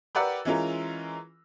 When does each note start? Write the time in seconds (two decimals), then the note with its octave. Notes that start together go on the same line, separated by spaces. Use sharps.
0.15 G4 A#4 B4 D5 F#5 E6
0.45 E3 G#3 C#4 F4 A#4